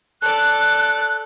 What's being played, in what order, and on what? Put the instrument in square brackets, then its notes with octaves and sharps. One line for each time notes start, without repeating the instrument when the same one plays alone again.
[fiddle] A4 D5 [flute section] F#6